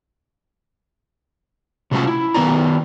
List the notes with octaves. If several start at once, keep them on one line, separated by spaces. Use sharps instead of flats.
C3 F#3 A3 C#4 F4 A5
E4
D#3 B3 A#4 D5 A#5